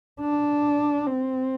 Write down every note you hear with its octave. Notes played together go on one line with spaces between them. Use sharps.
D4
C4